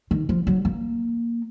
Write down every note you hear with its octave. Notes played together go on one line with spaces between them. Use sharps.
D#3
F3
F#3
A#3